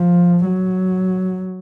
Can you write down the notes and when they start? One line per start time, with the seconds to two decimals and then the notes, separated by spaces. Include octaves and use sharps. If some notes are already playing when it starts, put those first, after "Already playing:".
Already playing: F3
0.44 F#3